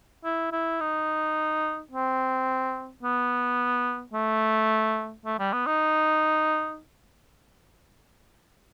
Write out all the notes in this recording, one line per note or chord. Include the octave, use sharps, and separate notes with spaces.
E4
E4
D#4
C4
B3
A3
A3
G3
B3
D#4